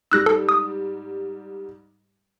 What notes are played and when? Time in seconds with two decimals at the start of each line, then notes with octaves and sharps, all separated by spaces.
0.11 G#2 G3 E6 F#6 A#6
0.26 A4
0.49 D#6